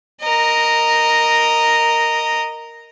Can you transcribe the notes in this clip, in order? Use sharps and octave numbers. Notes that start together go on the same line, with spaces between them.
A#4 D#5